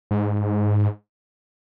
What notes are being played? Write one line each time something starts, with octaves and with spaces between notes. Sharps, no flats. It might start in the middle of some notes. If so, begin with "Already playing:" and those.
G#2